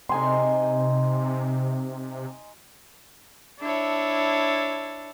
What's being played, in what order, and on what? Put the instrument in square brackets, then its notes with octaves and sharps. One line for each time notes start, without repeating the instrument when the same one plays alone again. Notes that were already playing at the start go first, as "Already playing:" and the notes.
[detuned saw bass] C3 [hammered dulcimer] D#4 G#5 C6
[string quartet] D4 E4 A4 C#5